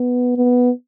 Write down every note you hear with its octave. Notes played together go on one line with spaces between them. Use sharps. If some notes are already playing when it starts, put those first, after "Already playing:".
Already playing: B3
B3